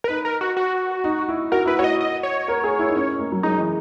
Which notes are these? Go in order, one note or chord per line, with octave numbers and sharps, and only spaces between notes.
A#4
D#4 B4
A#4
F#4
F#4
D#4
E4
F#4 A#4
E4 B4
F#4 C#5
D#5
D#5
C#5
A#4
G#4
E4
D#4
C#4
A#3
F#3
G#3 D#4
E3